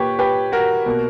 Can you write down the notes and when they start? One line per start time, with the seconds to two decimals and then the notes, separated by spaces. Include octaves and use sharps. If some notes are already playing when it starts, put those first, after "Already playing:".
Already playing: A#2 A#3 G4 B4 C#5
0.19 G4 B4
0.52 F#4 A#4
0.86 B2 A#3